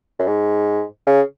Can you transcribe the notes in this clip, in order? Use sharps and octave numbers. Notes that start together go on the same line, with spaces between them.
F#2
G#2
C#3